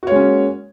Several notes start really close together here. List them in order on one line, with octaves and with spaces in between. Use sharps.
F#4 C#5 G#3 C#4 A#3